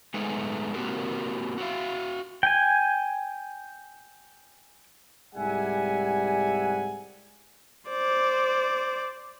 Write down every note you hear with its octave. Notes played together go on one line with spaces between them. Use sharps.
G#3 A3 B3 D#4 G#4
A#3 C4 F#4 G4 A#4
F#4 G4 B4 E5 F5
G5 G#5
C2 G#2 G3 E5 F#5 G#5
C5 D5